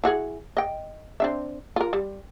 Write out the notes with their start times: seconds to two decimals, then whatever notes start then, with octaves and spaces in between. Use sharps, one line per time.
0.04 E4 F#4 G#4
0.57 D#5 G5
1.20 C4 D4 E5
1.76 F4 A#4
1.93 G3